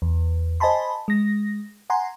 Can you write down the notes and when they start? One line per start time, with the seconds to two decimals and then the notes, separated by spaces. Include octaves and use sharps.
0.02 E2
0.60 C5 D#5 G#5 A5 B5 C6
1.08 G#3 A#6
1.90 F#5 G#5 A#5 C6